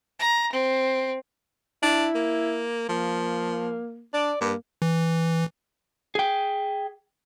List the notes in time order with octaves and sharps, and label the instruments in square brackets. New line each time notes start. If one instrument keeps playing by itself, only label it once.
[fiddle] A#5
C4
[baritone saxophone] D4 [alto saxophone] E4
[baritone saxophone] A#3
[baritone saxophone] F3 [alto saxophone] A#3
[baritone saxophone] D4 [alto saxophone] D5
[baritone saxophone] G2 [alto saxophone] A#3
[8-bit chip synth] E3
[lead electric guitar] G#4 G5